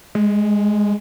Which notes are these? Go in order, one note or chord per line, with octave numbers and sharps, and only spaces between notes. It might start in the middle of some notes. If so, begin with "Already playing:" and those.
G#3